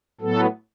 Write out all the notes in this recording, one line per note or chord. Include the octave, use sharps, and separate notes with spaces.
A2 F#3 B3 A4